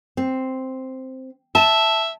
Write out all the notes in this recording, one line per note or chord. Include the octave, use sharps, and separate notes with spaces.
C4
E5 A5